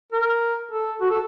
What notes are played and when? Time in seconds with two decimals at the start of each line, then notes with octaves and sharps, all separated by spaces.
0.12 A#4
0.71 A4
1.01 F#4
1.10 A4